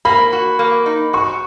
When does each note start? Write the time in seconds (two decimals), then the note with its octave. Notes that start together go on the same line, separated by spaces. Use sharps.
0.05 A#3 B5
0.33 F#4
0.59 A#3
0.86 D#4
1.13 F#4 C#6